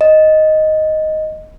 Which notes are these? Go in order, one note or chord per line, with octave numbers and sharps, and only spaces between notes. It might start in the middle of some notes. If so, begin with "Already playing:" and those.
D#5